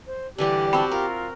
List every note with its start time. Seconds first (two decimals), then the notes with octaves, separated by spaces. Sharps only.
0.07 C5
0.38 D3 E3 G3 G4 D5
0.73 C4 F#4 G5 A5 B5
0.91 F4 A#4